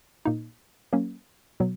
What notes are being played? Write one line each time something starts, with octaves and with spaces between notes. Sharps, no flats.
A#2 A#3 D#4
F#3 A#3 C#4
B2 F#3 B3